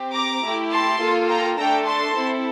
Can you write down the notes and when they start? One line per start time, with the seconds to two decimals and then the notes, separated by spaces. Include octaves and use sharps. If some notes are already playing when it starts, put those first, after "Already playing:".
Already playing: C4 G4
0.13 A#5 D6
0.42 A3 E4 G4
0.71 A5 C6
0.99 A#3 F4 A4
1.28 G5 A#5
1.57 A3 D4 A4 G5 A#5
1.85 A5 C6
2.15 C4 E4 A4